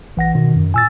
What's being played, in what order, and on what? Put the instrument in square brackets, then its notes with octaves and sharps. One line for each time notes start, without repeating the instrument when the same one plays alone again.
[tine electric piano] A#1 F#5 A#6 [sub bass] E3
[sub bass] B2 [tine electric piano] D#3
[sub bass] F#2
[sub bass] A#2 [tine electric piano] G#5 E6 A6